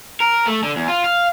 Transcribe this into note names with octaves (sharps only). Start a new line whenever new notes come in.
A#4
A3
D3
E2
F4
F5